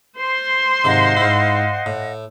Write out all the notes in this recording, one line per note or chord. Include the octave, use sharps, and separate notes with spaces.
C5 C6
G#2 C3 D#3 D#5 F5 F#5
G#2 E4
A2